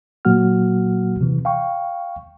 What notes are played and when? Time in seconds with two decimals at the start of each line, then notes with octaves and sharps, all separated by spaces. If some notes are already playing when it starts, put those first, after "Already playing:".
0.25 A#2 F#3 A#3 F#4 F#5 F6
1.21 C3 E3
1.45 F5 G5 C#6